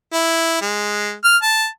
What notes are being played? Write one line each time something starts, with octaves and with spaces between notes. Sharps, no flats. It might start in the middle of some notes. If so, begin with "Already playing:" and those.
E4
G#3
F6
A5